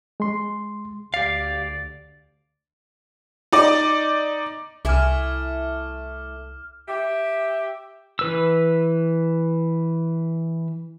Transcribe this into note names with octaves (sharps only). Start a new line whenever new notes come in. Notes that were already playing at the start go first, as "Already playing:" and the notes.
G#3 C6
D2 G4 D5 F5
D#4 D5
C2 A3 E4 G#5 D6 F6
G4 E5
E3 B4 E6